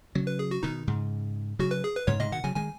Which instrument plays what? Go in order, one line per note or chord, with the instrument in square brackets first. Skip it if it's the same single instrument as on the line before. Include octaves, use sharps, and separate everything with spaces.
[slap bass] C#3 F#3
[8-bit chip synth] B4
G#4
F#4
[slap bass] B2 D#3 [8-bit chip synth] D#4
[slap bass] G#2 C#3
[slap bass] C#3 F#3 [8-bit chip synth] F#4
[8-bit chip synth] B4
G#4
B4
[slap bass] G#2 C#3 [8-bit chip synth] C#5
[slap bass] G#2 C#3 [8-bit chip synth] D#5
[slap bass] B2 D#3 [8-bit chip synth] F#5
[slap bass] C#3 F#3 [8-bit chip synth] G#5
[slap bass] D#3 G#3 [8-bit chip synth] G#5